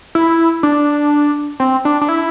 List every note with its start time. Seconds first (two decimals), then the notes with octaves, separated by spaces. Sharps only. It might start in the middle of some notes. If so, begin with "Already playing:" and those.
0.15 E4
0.63 D4
1.60 C4
1.85 D4
2.01 D4
2.09 E4